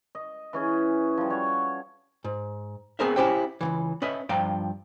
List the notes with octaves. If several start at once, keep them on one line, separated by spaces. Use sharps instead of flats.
D#5
E3 C#4 G#4
F3 G3
F#4 C#5
G#2
B3 C4 G#4 A#4 C5 E5
C#4 E4 F4 G4 C5 G5
C#2 C#3 E3
C#4 B4 D#5 E5
G2 F3 F5 G5 A#5